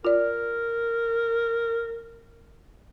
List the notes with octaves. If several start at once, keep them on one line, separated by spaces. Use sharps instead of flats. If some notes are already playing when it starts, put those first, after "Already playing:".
F4 A#4 D5